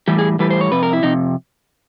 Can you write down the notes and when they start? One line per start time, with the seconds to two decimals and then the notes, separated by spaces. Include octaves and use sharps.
0.08 A2 E3 G3 G4
0.19 G#4
0.39 A2 E3 G3 B4
0.51 C5
0.61 C#5
0.71 F2 C3 B4
0.83 A#4
0.93 E4
1.03 F2 C3 D#4